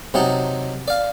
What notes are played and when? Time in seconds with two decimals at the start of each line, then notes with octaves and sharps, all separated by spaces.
0.14 C3 F#3 D#4 A5
0.88 D5 F5